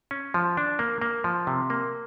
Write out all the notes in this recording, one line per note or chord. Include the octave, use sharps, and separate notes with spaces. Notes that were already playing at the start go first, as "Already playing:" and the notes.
C#4
F3
D4
A#3
A#3
F3
C3
A#3